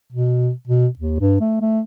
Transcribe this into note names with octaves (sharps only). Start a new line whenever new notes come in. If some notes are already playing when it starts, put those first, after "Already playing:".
B2
B2
D#2
G2
A3
A3